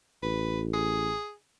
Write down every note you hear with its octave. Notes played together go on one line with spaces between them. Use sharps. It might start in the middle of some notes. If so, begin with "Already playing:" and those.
A1 B4
G#4